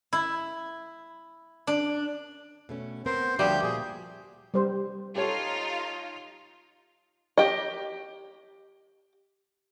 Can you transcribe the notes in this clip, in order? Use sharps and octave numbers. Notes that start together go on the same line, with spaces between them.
E4
D4
B2 A3 C#4
B3 C4 A#4 C5
D2 F3 G3 F#4 G4 A#4 E5 G6
A#2 G#4
G3 C5
D#4 F4 G4 A4 C#5
G4 D#5